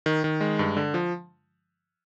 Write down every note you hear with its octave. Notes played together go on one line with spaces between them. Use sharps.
D#3
D#3
G#3
G2
D3
F3